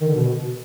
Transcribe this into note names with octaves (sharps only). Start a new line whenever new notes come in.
D#3
D3
B2